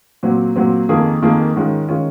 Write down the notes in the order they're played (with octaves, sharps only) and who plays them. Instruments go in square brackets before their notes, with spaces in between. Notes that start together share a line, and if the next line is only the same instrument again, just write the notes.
[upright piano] A#2 F#3 C4
A#2 F#3 C4
F2 D#3 A#3 F4 G#4
F2 D#3 A#3 F4 G#4
G#2 D#3 G#3 C#4 F4
D#3 G#3 C#4 F4